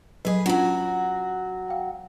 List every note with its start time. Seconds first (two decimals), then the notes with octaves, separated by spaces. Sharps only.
0.25 F#3 G#4 B4 D#5
0.46 F#3 C#4 D4 F4 F#4
1.68 F5 G5